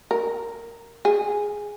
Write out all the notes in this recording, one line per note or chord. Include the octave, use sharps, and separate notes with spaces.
A#4
G#4